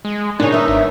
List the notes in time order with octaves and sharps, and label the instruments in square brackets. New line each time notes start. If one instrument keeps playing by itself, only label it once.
[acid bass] G#3
[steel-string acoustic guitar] A#2 C#3 [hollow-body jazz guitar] D4 C#5 [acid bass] D#4
[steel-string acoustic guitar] D#3 B3 [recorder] E5
[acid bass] G#1